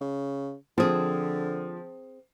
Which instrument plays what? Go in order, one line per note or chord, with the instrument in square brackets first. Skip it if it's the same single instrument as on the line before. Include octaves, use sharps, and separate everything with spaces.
[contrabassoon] C#3
[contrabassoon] D3 [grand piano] F3 [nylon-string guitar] C4 G#4